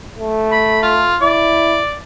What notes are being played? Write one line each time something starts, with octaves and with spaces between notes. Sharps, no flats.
A3
B5
F4
E4 D5